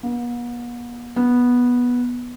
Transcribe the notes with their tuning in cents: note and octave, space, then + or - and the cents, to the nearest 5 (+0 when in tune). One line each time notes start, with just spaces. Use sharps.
B3 -45
B3 -10